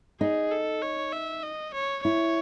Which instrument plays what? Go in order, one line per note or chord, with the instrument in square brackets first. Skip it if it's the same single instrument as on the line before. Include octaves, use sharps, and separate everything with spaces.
[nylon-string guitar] D#4 [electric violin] G#4
[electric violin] A4
C#5
E5
D#5
C#5
[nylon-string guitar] E4 [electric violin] C#5